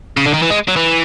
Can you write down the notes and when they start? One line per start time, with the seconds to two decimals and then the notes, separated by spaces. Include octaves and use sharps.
0.17 C#3
0.26 D3
0.34 D#3
0.42 E3
0.50 G#3
0.68 F#3
0.76 E3